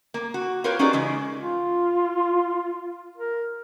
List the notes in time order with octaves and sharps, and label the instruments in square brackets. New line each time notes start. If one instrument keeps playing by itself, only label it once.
[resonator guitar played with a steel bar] A#3
F#4
F4 G4 A#4 B4 C#5
C#4 D#4 F#4 G#4 D5
C#3 E3 G#3
[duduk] F4
A#4